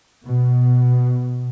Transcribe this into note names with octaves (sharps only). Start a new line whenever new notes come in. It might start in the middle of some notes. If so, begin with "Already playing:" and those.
B2